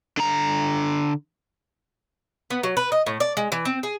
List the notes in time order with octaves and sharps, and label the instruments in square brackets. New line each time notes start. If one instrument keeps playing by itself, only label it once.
[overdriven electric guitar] D3 A#5
[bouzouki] B3
F#3
B4
D#5
A2
D5
G#3
E3
C4
G#4